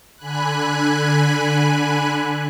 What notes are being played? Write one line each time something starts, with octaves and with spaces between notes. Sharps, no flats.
D3 G#5 B5 F#6